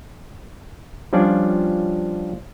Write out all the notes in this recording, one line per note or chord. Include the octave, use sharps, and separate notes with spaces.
F3 G3 C#4 D4 F4 D5